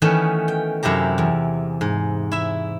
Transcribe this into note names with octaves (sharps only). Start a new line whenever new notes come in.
D#3 E3 A3 B3 C#4
G5
F#2 C3 E4 G4 A#5
E2
G#2
E4 E5